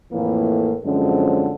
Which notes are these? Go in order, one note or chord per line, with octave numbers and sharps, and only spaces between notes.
F2 A2 E3 A#3
F#2 D3 F3 G#3 C4 C#4